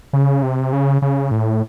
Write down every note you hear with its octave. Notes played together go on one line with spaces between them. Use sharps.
C#3
C3
C#3
C#3
A2